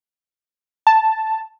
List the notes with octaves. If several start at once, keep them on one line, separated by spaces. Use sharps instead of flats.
A5